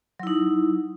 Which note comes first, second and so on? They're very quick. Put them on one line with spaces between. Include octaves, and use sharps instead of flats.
F#3 E4 D#4